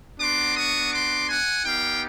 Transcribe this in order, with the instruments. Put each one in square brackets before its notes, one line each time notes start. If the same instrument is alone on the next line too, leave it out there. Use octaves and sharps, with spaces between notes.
[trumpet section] B3 D4 F#4 C6 D6
C#6 D#6
C6 D6
F#5 G#5
B3 D#4 G4 F5 G5